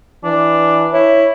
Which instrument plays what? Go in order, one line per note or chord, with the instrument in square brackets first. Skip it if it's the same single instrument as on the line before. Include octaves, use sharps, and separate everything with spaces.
[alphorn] E3 [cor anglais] D4
[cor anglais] E4 [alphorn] C#5